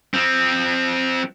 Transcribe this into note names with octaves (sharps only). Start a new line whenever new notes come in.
F3 C4